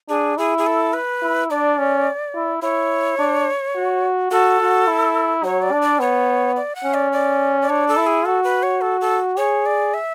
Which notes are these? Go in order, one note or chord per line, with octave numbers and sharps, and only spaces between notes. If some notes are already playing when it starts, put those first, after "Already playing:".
D4 G#4
E4 G#4
G#4
A4
B4
E4
D4 D5
C#4
E4
E4 C#5
D4
F#4
F#4 A4
F#4
E4
F#3 C#5
D5
D4
D5
B3 C#5
D5
F#5
C#4
D5
D5
D5
D4 C#5
A4
E4
G#4
F#4 A4
B4
C#5
A4
A4
G#4 C#5
D5
E5